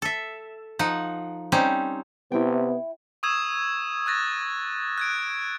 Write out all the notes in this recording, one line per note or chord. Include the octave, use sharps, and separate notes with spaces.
A4 E5
F3 D#4 F#5
G3 C4 C#4 D#4
C3 B3 E4 G5
C#6 D#6 E6 G#6 E7
C#6 F#6 A6 A#6
F#6 G#6 D7